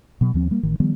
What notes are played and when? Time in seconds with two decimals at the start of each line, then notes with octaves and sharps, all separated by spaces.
0.21 B2 F#3 B3
0.34 D#2 F3 C4
0.51 G3 A#3
0.63 A1 D#3
0.80 D#3 F3 G3 B3